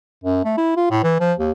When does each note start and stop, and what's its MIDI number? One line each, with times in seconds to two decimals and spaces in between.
0.24 0.42 42
0.45 0.57 57
0.58 0.72 64
0.77 0.89 65
0.91 1.01 45
1.03 1.16 52
1.20 1.34 53
1.39 1.52 39